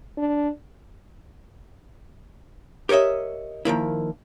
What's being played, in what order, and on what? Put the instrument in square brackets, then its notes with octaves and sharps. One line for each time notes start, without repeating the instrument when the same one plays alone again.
[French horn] D4
[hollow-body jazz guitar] G4 A#4 C#5 D#5 E5
D#3 F3 A#3 E4